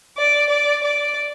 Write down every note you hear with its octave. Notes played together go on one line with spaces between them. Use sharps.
D5
D5
D5